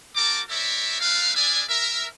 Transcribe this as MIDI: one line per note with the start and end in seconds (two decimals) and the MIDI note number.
0.16 0.40 60
0.16 0.40 66
0.16 0.40 70
0.16 0.40 81
0.16 0.40 86
0.49 0.99 60
0.49 0.99 70
0.49 0.99 73
0.49 0.99 74
0.49 0.99 76
1.01 1.34 55
1.01 1.34 57
1.01 1.34 62
1.01 1.34 71
1.01 1.34 77
1.35 1.63 56
1.35 1.63 62
1.35 1.63 68
1.35 1.63 74
1.35 1.63 76
1.35 1.63 80
1.69 2.06 70
1.69 2.06 76